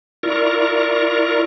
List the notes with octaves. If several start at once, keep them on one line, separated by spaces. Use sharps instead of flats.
E4 F4 A#4 D5 A#5 C#6